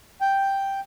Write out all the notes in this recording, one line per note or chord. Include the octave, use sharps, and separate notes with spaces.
G5